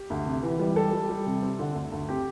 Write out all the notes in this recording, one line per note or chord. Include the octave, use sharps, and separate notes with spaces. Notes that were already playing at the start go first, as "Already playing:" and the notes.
Already playing: G4
D2
C3
E3
G3
G3 A4
G3
G3
C3
C4
D3
D2
D2
C4 G4